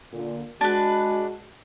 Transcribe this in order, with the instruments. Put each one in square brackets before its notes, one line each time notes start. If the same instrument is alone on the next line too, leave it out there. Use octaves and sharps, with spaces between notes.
[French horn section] A#2 D3
[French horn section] G#3 F#4 [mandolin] D4 B4